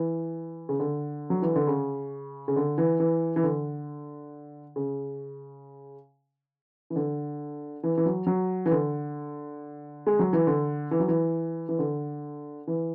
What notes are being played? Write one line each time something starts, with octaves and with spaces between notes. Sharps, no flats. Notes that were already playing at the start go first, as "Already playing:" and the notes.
Already playing: E3
C#3
D3
F#3
E3
D3
C#3
C#3
D3
E3
E3
E3
D3
C#3
E3
D3
E3
E3
F#3
F#3
E3
D3
G#3
F#3
E3
D3
E3
F#3
E3
E3
D3
E3